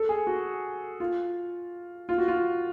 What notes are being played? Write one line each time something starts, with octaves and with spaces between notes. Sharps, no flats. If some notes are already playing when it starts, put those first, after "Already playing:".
Already playing: A4
G#4
F#4
F4
F4
F#4
F4